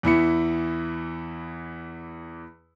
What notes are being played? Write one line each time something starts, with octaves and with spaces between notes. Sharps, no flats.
E2 E3 E4 C#7